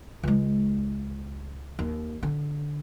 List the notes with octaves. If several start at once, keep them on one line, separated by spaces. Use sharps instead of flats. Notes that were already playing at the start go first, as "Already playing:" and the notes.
C#2 G#3
D#2
D3